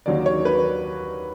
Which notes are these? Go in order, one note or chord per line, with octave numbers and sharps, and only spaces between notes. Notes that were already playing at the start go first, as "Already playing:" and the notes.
D#2 D#3 F#3 A#3 D5
C#5
B4